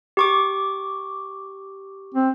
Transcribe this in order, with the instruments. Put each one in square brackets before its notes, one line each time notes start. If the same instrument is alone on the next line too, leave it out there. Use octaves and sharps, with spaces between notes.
[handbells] G4 C#6 D6
[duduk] C4